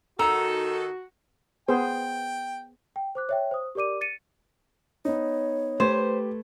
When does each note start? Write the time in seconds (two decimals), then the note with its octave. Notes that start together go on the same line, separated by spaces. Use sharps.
0.19 D#3 D#4 F#4 A4 A#5 E6
1.68 B3 G#4 C5 G5
2.96 G5
3.15 C5 D6 F#6
3.29 C#5 E5 G5
3.51 C5 D#6
3.75 G4 A#4 D5 D6 D#7
4.01 A6 C#7 D#7
5.05 B3 D#4 C#5
5.80 A3 G4 B4 C5 G#6